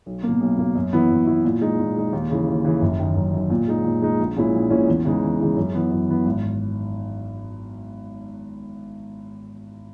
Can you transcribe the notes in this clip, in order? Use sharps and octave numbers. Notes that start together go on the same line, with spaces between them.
B1
A#3
B2
B1
B2 A#3
F#2
E3 B3 E4
F#2
E3 B3 E4
A#2
G#3 D#4
A#2
G#3 D#4
D#2
C#3 E3
D#2
C#3 E3
F#1
F#2 D#3
F#1
F#2 D#3
A#2
G#3 D#4
A#2
G#3 D#4
A#1
A#2 G#3 C#4 E4
A#1
A#2 G#3 C#4 E4
E2
C#3 E3 G#3 D#4
E2
C#3 E3 G#3 D#4
F#2
E3 B3
F#2
E3 B3
G#1